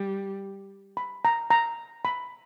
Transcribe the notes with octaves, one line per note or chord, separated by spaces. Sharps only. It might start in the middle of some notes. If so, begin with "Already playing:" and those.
Already playing: G3
B5
A#5
A#5
B5